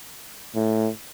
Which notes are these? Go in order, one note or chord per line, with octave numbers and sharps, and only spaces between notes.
A2